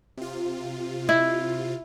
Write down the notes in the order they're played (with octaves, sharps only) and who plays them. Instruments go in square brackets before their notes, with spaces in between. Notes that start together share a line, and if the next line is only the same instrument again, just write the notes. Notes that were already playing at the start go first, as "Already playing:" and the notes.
[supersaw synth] C3 F4
[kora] E4